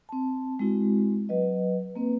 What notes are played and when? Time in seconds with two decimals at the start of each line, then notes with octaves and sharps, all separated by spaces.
0.09 C4 A5
0.59 G#3 C4 E4 F#4
1.29 F#3 B4 D#5
1.95 A#3 C4 B4